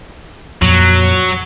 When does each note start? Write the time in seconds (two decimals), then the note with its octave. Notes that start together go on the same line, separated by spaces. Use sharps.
0.62 F2 A#2 F#3